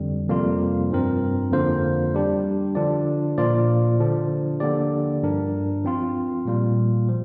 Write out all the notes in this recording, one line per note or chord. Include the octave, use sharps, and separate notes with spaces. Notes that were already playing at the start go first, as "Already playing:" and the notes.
Already playing: F2 D3 G3
F2 C3 G3 A#3 F4
G2 F3 C4 A#4
F2 D3 A#3 F4 C5
G3 D4 G4
D3 F3 D4 F4 D5
A#2 F3 A#3 F4 D5
D3 F3 D4
D3 A#3 G4 D5
G2 F3 D4 A#4
F3 C4 F4
A#2 G3 A#3 F4
F3